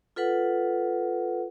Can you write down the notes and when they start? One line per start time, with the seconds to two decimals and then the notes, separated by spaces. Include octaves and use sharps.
0.16 F4 A4 B4 F#5